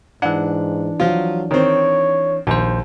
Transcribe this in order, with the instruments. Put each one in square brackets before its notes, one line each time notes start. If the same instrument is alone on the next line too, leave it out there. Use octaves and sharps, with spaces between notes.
[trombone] G#2 [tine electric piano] E3 D4 [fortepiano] F#5
[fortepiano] F3 F4 [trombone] F#3
[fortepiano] D#3 C4 [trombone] C#5
[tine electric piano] A#1 C5 [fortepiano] D#2